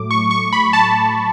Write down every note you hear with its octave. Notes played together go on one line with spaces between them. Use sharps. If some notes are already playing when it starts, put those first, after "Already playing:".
Already playing: A2 F#3 A3 D6
C#6
C#6
B5
A5